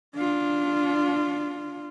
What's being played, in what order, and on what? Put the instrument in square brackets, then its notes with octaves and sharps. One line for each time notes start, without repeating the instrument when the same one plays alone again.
[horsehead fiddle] D4 F4